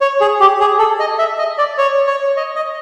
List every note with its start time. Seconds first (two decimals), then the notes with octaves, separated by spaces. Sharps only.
0.01 C#5
0.21 G#4
0.40 G4
0.60 G#4
0.79 A4
1.00 D#5
1.18 E5
1.38 D#5
1.58 D5
1.78 C#5
2.07 C#5
2.37 D#5
2.56 D#5